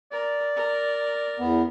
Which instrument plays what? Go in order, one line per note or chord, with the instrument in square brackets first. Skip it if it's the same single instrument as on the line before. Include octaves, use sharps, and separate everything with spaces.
[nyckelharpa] A#4 [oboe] D5
[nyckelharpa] A#4
[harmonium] E2 B3